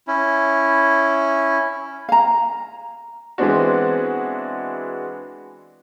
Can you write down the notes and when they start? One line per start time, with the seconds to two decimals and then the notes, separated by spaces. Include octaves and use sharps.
0.08 C#4 E4
2.09 F5 A#5
3.38 E3 G#3 B3 C4 D4 F#4